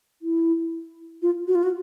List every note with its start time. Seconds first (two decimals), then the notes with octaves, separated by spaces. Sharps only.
0.22 E4
1.22 F4
1.47 F#4
1.55 F4
1.63 F#4